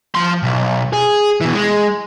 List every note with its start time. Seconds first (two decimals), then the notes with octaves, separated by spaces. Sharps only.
0.15 F3 C6
0.43 B1
0.93 G#4
1.41 B2 E3
1.54 G#3